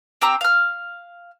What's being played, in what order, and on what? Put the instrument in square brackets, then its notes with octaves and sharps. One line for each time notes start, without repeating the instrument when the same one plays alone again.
[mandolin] C4 G4 A#5 E6
F5 F6